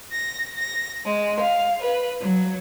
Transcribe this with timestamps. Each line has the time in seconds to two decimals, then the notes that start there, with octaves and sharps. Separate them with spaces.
0.10 A#6
0.55 A#6
1.04 G#3
1.40 F5
1.81 B4
2.19 F#3